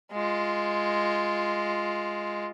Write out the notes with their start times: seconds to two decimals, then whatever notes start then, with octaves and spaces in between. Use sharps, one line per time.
0.12 G#3 F4